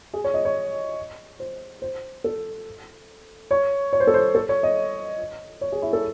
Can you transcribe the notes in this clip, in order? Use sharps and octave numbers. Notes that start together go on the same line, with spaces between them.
G#4
C#5
D#5
C#5
C5
C5
A4
C#5
C#5
C5
A4
C5
A4
C#5
D#5
C#5
G#4
E4
A4